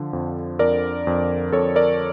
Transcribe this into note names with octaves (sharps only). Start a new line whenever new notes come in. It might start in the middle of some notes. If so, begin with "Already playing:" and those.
Already playing: D3 F3
F2
F2 A#4 D5
F2
F2 A4 C#5
A#4 D5